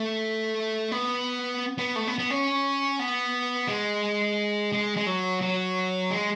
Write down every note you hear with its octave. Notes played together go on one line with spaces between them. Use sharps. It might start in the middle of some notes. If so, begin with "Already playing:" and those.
Already playing: A3
B3
B3
A3
B3
B3
C#4
B3
G#3
G#3
G#3
F#3
F#3
G#3